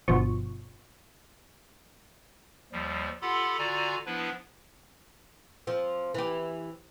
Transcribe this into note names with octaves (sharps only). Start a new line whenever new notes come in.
G1 B2 F3 C#6
D#2 F3 G3
F4 G4 A4 F#5 B5 C6
D3 F4 F#4 D5 G#5 A#5
F3 B3 D4 E4 B4
F3 C4
E3 G4